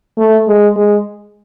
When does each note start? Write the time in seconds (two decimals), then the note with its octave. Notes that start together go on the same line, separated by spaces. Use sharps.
0.18 A3
0.48 G#3
0.76 G#3